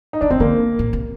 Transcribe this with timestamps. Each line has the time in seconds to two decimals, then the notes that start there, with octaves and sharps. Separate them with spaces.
0.13 D#4
0.21 D3 D4
0.30 D#3 C4
0.40 D3 A#3
0.79 A#2
0.93 C3